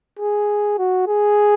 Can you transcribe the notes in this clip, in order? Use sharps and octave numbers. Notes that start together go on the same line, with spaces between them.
G#4
F#4
G#4